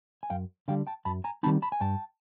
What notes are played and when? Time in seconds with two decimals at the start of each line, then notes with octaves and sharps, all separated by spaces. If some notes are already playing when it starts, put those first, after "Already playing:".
0.23 G#5
0.30 F#2 F5 G5
0.68 D3 G3 F5 G5
0.87 G5 A5
1.05 F#2 A5 B5
1.24 G#5 A#5
1.43 D#3 G3 C4 D#4 A5 B5
1.62 A5 B5
1.72 G#5
1.80 G2 G5 A5